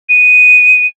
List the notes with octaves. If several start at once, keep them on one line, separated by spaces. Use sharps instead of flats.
D#7